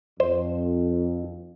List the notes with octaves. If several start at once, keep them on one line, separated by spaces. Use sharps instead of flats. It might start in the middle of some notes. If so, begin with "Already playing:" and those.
F2 C5